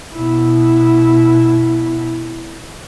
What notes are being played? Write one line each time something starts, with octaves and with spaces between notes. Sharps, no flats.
B2 E4